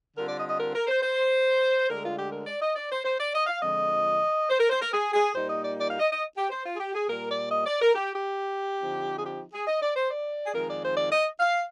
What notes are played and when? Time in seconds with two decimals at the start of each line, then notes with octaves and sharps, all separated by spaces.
0.15 D3 G3 C4 F4 A#4
0.28 D5
0.38 D#5
0.48 D#5
0.59 A#4
0.74 A#4
0.87 C5
1.02 C5
1.89 D2 D3 G#3 A#4
2.03 F4
2.18 G4
2.31 A#4
2.46 D5
2.60 D#5
2.76 D5
2.90 C5
3.04 C5
3.18 D5
3.34 D#5
3.47 F5
3.61 F2 D3 F3 G#3 D#5
4.49 C5
4.59 A#4
4.70 C5
4.80 A#4
4.92 G#4
5.13 G#4
5.35 A#2 G3 A#3 D#4 C5
5.49 D#5
5.63 D5
5.78 D5
5.89 F5
5.99 D#5
6.11 D#5
6.36 G4
6.49 C5
6.64 F4
6.73 G#4
6.79 G4
6.93 G#4
7.08 A#2 G3 A#3 A#4
7.30 D5
7.50 D#5
7.65 D5
7.80 A#4
7.95 G4
8.15 G4
8.81 D3 F3 C4 D#4
9.18 G#4
9.24 G4
9.53 G#4
9.67 D#5
9.82 D5
9.95 C5
10.09 D5
10.45 G#4
10.53 F2 D#3 G#3 A#4
10.69 D5
10.83 C5
10.97 D5
11.11 D#5
11.40 F5